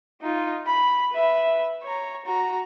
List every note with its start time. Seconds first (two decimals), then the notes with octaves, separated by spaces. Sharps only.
0.22 D#4 F4
0.66 B5
1.11 B4 E5
1.83 C#5 A#5
2.26 F#4 A#5